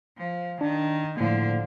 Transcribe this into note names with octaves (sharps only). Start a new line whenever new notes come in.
F3
D#3 D4
A2 D3 F3 A#3